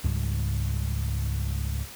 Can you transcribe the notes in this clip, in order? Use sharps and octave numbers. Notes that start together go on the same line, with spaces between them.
C#2 G#2 G3 G#3